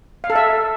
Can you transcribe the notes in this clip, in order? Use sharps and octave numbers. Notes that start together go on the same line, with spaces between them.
F5
A4
E5